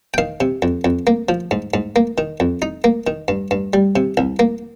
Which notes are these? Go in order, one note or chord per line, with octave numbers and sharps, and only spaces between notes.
G5
D#3 F5
C3
F2
F2
A#3
F3
G#2
G#2
A#3
D#3
F2
D#4
A#3
D#3
G2
G2
G3
C3
C2
A#3